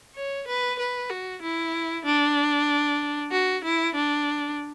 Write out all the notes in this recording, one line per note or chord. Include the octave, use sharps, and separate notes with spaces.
C#5
B4
B4
F#4
E4
D4
F#4
E4
D4